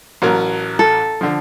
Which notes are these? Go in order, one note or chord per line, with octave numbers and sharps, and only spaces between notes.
A1 F#3 A#4
A4
D3 F3